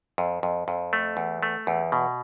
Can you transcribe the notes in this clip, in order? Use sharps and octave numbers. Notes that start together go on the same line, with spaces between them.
F2
F2
F2
A3
E2
A3
E2
B2